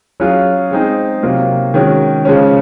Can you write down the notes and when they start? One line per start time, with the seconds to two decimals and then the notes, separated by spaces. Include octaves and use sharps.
0.20 F#3 C#4 F4 G#4
0.71 G#3 C4 D#4 G#4
1.23 C3 F#3 A#3 F4
1.74 D#3 G#3 C#4 F#4
2.25 C#3 F3 G#3 C#4